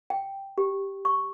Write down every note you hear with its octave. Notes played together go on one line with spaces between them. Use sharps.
G5
G4
C#6